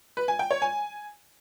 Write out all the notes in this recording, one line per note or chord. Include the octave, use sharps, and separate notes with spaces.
B4
G#5
G5
C#5
G#5